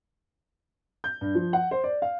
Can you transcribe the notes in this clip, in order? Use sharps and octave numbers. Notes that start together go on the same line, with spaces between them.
G6
G2
F3
F#5
C5
D5
F5